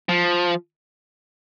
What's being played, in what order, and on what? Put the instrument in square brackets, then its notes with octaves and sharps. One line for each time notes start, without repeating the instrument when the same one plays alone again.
[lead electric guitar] F3